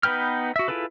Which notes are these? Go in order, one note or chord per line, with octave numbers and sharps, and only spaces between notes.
B3 D#4 B4 G5 F6
F#4 E5
E4 F4 G#4 A4 B4